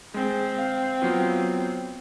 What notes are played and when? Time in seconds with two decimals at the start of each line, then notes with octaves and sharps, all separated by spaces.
0.14 G#3 C4
0.58 F5
1.02 F#3 B3 F4